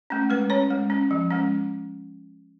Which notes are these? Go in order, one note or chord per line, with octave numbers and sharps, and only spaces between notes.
A3 C#4
G#3 B4
C#4 C#5
G#3
C#4
F3
G#3 C#4